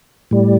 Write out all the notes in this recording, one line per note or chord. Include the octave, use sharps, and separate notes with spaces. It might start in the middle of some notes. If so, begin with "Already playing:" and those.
A2 G3